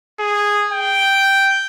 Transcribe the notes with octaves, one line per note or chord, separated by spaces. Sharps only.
G#4
G5